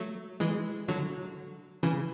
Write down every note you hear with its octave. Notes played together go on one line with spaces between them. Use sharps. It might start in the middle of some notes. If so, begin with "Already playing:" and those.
Already playing: F#3 A3
E3 G#3
D3 F#3
C#3 E3